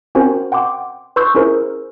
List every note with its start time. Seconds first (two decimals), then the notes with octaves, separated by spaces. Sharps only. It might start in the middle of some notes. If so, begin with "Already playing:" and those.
0.15 C4 C#4 F#4 A#4 C5
0.52 F#5 G5 C6 D6
1.16 B4 C6 C#6 E6 G6
1.35 C#4 E4 G#4 A#4 C5